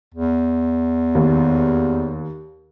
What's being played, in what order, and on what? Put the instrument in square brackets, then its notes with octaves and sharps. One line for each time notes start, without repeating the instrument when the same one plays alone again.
[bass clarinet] E2
[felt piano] D#2